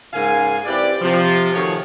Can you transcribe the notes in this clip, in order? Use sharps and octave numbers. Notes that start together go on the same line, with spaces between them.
G#2 C#3 A#3 F5 G#5
C4 E4 G4 B4 D5
C3 F3
D#3 F3 A3 F#4 G#4 C#5